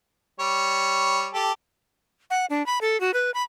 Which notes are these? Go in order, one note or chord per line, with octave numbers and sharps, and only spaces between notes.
G3 C#5
G4 A4
F#5
D4
B5
A4
F#4
B4
B5